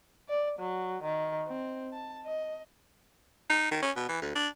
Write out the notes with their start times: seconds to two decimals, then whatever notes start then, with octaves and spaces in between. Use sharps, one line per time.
0.29 D5
0.59 F#3
1.03 D#3
1.47 C4
1.93 A5
2.26 D#5
3.50 D#4
3.71 D#3
3.82 C#4
3.96 B2
4.09 E3
4.22 D2
4.36 D4